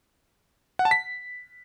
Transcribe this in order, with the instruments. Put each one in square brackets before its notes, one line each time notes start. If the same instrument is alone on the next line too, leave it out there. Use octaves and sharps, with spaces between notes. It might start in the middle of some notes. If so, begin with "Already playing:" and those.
[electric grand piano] F#5
A5
B6